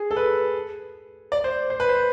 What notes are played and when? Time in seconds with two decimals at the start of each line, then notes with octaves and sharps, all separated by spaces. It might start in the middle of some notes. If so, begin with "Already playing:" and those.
Already playing: G#4
0.11 A4
0.16 B4
1.32 D5
1.44 C5
1.70 C5
1.80 B4
1.89 C5